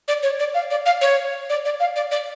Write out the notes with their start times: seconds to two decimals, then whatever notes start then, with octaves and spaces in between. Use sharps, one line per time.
0.08 D5
0.23 C#5
0.40 D5
0.54 F5
0.71 D5
0.86 F5
1.01 C#5
1.50 D5
1.65 D5
1.80 F5
1.96 D5
2.11 D5